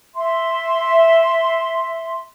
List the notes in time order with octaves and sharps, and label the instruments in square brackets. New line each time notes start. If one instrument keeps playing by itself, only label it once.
[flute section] E5 C6